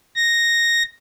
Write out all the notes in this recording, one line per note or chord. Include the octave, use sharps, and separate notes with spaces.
A#6